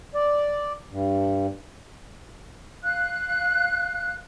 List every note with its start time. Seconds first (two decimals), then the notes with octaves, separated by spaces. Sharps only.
0.14 D5
0.91 G2
2.82 F5 F#6